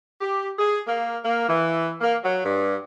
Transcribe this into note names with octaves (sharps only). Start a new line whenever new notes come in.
G4
G#4
A#3
A#3
E3
A#3
F#3
G2